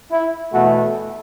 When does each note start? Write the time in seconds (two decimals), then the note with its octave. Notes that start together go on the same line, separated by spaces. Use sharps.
0.11 E4
0.52 E2 B2 A3 F#4